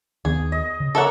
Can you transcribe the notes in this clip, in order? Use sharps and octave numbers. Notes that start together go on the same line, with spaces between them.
D#2 D#3 B3 G#4
D#5
C#3
A#3 A4 C#5 E5 F#5 C#6